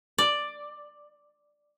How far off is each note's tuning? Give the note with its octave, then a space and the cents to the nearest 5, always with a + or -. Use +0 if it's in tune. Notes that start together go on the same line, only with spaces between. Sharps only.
D5 +5